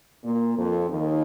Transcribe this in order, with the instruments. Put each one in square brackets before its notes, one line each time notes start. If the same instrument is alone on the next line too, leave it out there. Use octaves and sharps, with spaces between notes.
[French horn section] A#2 A#3
F2 F3
D#2 D#3